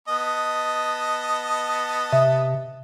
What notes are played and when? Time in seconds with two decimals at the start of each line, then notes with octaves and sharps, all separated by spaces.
0.08 B3 D#5 A5
2.12 C3 E5